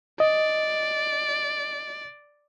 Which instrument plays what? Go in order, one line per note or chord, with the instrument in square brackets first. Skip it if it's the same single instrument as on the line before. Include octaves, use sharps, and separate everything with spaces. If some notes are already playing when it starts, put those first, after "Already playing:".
[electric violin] D5 [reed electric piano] D#5